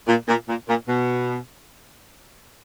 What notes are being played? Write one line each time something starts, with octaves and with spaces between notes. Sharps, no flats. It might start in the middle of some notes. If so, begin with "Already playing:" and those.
A#2
A#2
A#2
A#2
B2